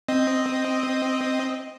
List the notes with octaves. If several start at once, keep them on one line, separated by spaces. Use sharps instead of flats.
C4 D#5